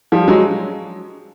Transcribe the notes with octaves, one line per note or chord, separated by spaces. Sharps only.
F3 G3
F#3 G#3